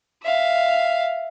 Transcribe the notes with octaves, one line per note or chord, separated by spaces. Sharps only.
E5 F5